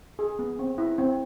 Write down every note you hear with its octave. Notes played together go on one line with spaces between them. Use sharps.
G#4
B3
C4
E4
C4